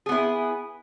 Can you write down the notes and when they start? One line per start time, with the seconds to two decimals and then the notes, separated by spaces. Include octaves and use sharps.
0.06 G#4
0.09 B3
0.12 E4